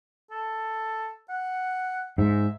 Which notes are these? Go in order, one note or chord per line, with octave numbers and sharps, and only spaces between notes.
A4
F#5
G#2 E5